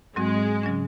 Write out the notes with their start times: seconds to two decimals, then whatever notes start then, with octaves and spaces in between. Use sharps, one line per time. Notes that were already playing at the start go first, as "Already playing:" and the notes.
0.16 G#2 F#3 G#3 C4 F#4
0.63 C#3 F#3 C#4